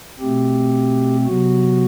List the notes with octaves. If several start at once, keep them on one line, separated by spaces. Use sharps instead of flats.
B2 A3 C4 G4
C3 F#3 B3 F#4